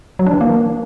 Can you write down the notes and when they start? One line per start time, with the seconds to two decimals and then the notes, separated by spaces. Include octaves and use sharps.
0.19 F#3
0.26 D4
0.34 E3
0.41 A#3